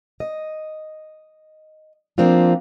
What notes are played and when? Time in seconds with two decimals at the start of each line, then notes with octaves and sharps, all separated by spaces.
0.20 D#5
2.18 F3 A#3 C4 D4 F4